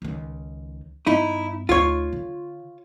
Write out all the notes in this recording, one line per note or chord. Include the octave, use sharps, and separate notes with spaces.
C#2 D#3
G2 B3 D#4 E4
D2 D#4 F4 C#5
D3